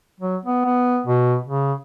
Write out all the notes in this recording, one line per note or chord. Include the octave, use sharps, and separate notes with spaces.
F#3
B3
B3
B2
C#3